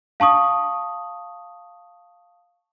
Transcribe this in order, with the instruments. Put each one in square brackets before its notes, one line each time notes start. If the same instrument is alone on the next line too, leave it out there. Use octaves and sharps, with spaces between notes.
[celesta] F5 A5 C#6 D#6